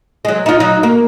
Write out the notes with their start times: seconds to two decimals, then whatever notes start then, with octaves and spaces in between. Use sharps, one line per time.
0.25 F#3 G#3
0.46 D#4 F4
0.60 F#3 D#4
0.83 A#3